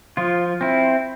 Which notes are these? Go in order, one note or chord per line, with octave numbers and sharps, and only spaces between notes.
F3 F4
C4 E4